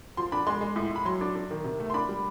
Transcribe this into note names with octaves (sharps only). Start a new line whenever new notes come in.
F3 C6
D4 B5
G#3 C6
G#3
A2
A2 B5
F#3 C6
D4
D4
D#3
C3
A3
C6
D4 B5
G3